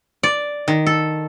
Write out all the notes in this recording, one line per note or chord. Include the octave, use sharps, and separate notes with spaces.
D5
D#3
A4